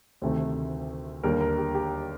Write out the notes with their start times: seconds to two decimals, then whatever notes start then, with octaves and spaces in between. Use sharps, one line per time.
0.22 D2 C3 D#3 A3
1.23 D#2 D3 G3 A#3 A#4
1.41 A#4
1.58 G4
1.75 G4